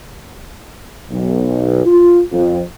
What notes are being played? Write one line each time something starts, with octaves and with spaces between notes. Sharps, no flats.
B1
F4
F2